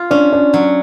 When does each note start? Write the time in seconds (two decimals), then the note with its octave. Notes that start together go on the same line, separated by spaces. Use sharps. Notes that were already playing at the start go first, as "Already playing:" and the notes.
Already playing: F4
0.11 C#4 D4
0.33 D4
0.54 F#3